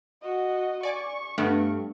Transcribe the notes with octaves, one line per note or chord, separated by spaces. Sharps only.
F#4 D#5
D5 G#5 C#6 D6
G2 A3 B3